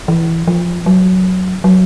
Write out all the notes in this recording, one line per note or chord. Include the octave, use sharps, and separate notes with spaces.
E3
F3
F#3
F#3